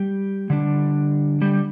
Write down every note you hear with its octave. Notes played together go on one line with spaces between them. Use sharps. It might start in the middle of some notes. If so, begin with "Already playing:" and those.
Already playing: G3 G4
D3 G3 D4
G3 G4